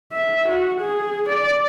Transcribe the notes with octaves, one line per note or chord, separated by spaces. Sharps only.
E5
F#4
G#4
D5